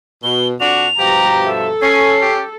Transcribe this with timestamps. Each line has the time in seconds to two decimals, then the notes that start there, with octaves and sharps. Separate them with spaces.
0.24 B2 G7
0.60 F2 D4 F#4 F7
0.99 G2 B2 F3 G4 A#5
1.45 A4 E5
1.82 C#4 G#5 C7
2.21 G4